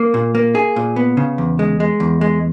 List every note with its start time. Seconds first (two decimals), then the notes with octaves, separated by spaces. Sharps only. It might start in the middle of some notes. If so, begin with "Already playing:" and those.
Already playing: A#3
0.14 A#2
0.35 A#3
0.55 G#4
0.76 A#2
0.96 B3
1.17 C#3
1.38 E2
1.59 G#3
1.80 G#3
2.00 E2
2.21 G#3